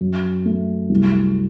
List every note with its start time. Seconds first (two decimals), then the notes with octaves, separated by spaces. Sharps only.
0.01 F#2
0.46 A3
0.90 C2